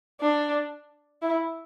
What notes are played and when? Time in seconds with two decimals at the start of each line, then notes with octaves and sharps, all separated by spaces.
0.21 D4
1.22 E4